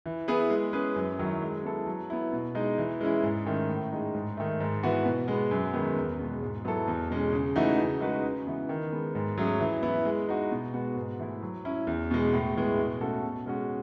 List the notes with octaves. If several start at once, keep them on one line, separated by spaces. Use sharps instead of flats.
E3
B3 E4 G#4 B4
G#3
C#4 G#4 B4
F#2
D#3 F#3 C#4 E4
G#3
B3 E4 A4
F#3
B3 E4
B2
G#3 D#4
E3
G#3 C#4 E4
G#2
D#3 A3 C#4
A2
G#3 D#4
G#2
D#3 A3
G#2
E3 B3 F#4 B4
B2
G#3 B3
F#2
D#3 G#3 B3
E2
B2 G#3
G#2
F#3 B3 E4 A4
E2
B2 G#3 C#4
C#3
E3 A3 D#4 F#4
C#3
G#3 D#4 F#4 B4
C#3
E3 B3
D#3
G#3 B3
G#2
F#3 A3 C#4 G#4
E3
B3 E4
G#3
D#4 F#4
B2
G#3 B3 F#4
G#2
E3 A3 E4
F#3
C#4 E4
E2
B2 G#3
A2
E3 G#3 B3
B2
A3 C#4 F#4 A4
B2
G#3 C#4 F#4